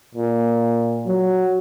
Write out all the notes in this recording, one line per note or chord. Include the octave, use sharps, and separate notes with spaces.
A#2
F#3